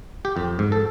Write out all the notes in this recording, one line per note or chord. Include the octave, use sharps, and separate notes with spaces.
G4
F2
G#2
A4